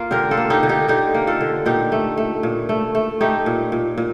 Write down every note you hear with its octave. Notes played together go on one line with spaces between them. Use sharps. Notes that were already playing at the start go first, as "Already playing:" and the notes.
Already playing: A#3 F4
D3 G4 A#4
F4 A4
A#3
D#4 G4
D3
D#4 G4
D3 D#4 G4
A#3
F4 A4
D3
A#2 D#4 G4
A3
A3
A#2
A3
A3
A3 D#4 G4
A#2
A#2
A#2